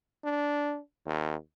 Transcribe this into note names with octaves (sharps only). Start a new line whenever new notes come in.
D4
D#2